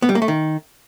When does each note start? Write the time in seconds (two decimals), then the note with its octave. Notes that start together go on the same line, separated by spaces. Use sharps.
0.02 B3
0.09 G3
0.15 A#3
0.22 A3
0.28 D#3